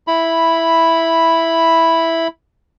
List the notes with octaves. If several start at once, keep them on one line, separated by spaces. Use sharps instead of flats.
E4 B5